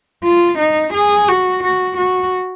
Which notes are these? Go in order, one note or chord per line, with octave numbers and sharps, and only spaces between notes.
F4
D#4
G#4
F#4
F#4
F#4